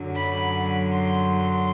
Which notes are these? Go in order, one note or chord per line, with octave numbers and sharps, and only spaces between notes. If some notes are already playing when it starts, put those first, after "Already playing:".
Already playing: F#2 D3 F#3
B5
C6